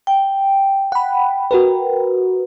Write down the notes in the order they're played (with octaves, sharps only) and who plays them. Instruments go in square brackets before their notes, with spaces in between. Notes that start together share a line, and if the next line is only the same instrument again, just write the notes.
[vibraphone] G5
[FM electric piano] F#5 B5
F#4 A#4 B4